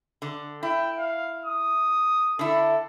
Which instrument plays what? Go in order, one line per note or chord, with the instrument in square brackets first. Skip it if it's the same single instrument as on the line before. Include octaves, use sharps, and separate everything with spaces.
[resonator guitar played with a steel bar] D3
[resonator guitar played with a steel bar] E4 [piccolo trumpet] G5
[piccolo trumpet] F5
D#6
[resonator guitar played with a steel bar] D3 E4 [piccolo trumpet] A4